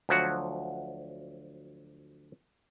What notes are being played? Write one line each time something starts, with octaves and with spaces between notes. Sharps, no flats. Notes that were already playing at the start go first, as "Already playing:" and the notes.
D2 F3 F#3 F#4